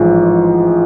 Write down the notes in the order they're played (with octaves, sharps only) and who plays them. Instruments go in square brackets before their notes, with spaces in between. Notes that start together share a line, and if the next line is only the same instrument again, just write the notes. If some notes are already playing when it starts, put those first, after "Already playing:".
Already playing: [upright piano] A1 G#2 F3 G#3